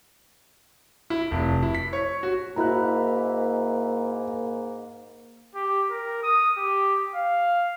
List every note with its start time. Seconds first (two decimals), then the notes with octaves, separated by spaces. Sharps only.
1.10 E4
1.31 F1
1.63 E4
1.75 B6
1.93 C#5
2.23 F#4
2.56 G#2 A#3 E4 F#4 A#5 B5 F#6
5.55 G4
5.90 A#4
6.23 D#6
6.57 G4
7.15 F5